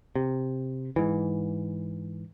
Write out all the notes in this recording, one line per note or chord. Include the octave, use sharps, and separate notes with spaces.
C3
G#2 E3